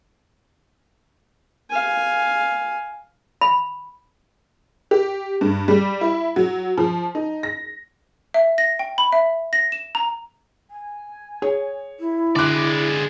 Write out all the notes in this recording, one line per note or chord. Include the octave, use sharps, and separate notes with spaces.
F5 G#5
B5
G4
G2
G3
E4
F#3
F3
D#4
A#6
E5
A#6
G5
B5
E5
A#6
E7
A#5
G#5
G#4 C#5
E4
D3 G#3 D5 D6 F#6